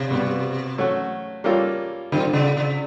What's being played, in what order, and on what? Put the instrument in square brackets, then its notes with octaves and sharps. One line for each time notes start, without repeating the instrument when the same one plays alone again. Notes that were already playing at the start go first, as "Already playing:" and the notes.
Already playing: [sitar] C3
[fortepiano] B2 G3 B3
F#3 A3 C#4 F#4
G3 A#3 C#4 F4 A4
[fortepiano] A#2 G3 C4 [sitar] D3
[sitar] C#3
C#3